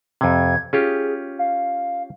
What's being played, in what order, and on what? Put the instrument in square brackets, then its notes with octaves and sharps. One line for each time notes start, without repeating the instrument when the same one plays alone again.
[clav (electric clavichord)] F2 C3 [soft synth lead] G#6
[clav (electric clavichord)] C#4 F4 G4 [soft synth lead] G#4
[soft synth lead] F5